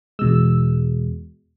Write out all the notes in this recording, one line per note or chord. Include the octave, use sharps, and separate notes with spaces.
E2 B2 G#3 E6